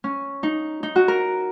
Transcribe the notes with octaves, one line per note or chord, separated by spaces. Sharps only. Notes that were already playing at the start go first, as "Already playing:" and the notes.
C#4
D#4
D#4
F#4
A#4